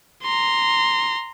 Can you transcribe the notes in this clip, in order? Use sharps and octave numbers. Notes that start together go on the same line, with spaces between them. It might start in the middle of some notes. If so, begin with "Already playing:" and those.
A#5 C6